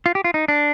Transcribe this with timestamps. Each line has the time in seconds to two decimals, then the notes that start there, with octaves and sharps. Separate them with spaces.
0.06 F4
0.15 G4
0.24 F4
0.34 D#4
0.48 D4